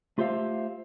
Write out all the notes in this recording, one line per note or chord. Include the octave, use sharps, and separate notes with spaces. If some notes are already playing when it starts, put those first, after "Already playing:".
A3 F4 G4 C5 E5 F5